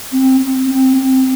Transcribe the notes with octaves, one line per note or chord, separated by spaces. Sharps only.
C4
C4
C4
C4